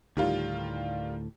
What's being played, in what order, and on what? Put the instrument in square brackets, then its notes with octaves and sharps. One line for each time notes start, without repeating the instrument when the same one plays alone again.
[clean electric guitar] D2 A2 [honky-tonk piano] D#3 G3 F4